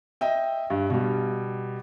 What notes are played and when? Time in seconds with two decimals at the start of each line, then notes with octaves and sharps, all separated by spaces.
0.21 D#5 E5 G5
0.70 G2
0.90 B2 G3